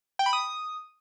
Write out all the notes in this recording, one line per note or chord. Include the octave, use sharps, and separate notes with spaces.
G5
B5
D#6